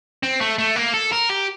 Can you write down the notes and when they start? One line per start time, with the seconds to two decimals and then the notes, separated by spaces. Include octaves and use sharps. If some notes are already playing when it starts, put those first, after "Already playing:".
0.23 C4
0.41 A3
0.59 A3
0.76 A#3
0.94 A4
1.12 A#4
1.29 G4